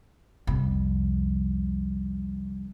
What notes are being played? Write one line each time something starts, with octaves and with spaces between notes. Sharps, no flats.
C2 F2